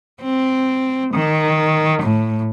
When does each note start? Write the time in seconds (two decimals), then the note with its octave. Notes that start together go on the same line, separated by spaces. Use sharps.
0.23 C4
1.13 D#3
2.01 A2